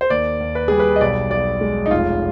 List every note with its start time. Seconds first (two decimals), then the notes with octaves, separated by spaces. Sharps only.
0.01 C5
0.10 D#2 D5
0.40 D#2
0.55 B4
0.68 G3 G#4
0.80 B4
0.96 D#5
1.01 B1 D5
1.30 B1 D5
1.61 G#3
1.86 D#4
1.91 F1 F4